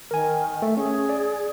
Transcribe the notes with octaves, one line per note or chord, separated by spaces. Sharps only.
D#3 A#4 G#5
A3
C#4 G#4
D5